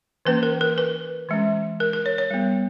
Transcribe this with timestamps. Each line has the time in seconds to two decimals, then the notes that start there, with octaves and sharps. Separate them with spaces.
0.25 E3 A#3 C#4 B4
0.43 A#4
0.61 A#4
0.78 B4
1.29 E3 G#3 C#4
1.80 A#4
1.93 A#4
2.06 C#5
2.18 C#5
2.31 G3 B3